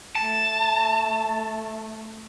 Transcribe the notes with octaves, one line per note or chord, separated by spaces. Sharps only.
A3 A5